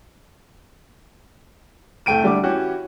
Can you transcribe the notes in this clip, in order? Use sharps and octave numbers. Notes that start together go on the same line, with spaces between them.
C2 A3 G5 D7 D#7
D3 G3 D6
E3 C#4 F#4 G4